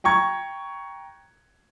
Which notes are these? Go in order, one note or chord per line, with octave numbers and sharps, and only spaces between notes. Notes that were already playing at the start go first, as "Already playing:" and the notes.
G5 A#5 C#6 G#6